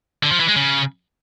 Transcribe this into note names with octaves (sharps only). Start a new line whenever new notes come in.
D3
F3
E3
G#3
C#3